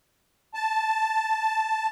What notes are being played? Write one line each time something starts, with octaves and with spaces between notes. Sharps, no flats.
A5